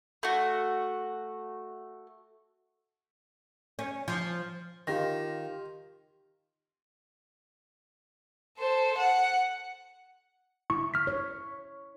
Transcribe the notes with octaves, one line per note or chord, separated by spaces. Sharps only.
A3 F#4
C#4
F3
D#3 F4 G4 A#6
A4 C5
F#5
E4 C#6
F6 B6
C#5